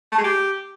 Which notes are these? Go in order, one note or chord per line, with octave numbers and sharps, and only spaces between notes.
A3
G#3
G4